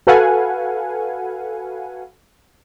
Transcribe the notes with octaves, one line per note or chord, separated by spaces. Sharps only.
F#4 A4 B4 F5 F#5 G#5